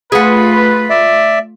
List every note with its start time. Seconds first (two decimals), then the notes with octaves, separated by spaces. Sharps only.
0.12 A3 F4 G#4 B4 F#5
0.90 D5 E5